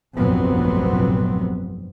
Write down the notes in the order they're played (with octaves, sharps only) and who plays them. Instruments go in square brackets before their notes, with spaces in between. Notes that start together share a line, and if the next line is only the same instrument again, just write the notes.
[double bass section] F1 A#1 G2 F#3 B3 C4